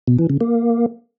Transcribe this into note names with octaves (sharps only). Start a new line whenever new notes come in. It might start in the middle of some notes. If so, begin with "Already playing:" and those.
B2
E3
C#3
A#3